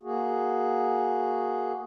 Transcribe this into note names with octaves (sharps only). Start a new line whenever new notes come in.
A#3 F#4 G#4